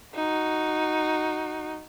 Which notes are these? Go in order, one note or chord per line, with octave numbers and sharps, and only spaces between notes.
D#4 F#4